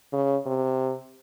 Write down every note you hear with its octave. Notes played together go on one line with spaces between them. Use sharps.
C#3
C3